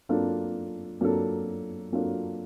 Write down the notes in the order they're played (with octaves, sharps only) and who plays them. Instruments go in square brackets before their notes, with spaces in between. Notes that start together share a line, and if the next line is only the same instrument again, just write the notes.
[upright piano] F#3 A#3 D4 F4 A4
F#3 A#3 D4 F4 A4
F#3 A#3 D4 F4 A4